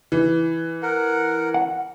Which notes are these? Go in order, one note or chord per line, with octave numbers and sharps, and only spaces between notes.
E3
A#4 F#5
F#5